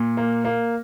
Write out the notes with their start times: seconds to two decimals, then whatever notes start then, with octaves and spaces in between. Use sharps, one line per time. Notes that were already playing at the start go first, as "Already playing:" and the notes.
Already playing: A#2
0.17 A#3
0.45 A#3